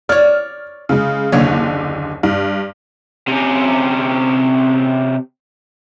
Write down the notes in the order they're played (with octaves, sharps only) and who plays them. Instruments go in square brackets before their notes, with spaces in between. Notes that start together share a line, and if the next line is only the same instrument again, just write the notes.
[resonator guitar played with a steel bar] C#5 D5 [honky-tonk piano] F6
[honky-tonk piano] C#3 G#3
[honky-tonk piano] F#1 D#2 D3 [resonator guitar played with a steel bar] C#5
[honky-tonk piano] G2
[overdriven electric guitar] C3 C#4